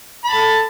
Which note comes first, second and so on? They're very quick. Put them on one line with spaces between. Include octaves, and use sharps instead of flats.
B5 A5 A4